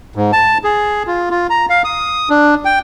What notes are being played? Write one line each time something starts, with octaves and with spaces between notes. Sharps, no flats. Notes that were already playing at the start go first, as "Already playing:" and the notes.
G#2
A5
G#4
F4
F4
A#5
F5
D#6
D4
G5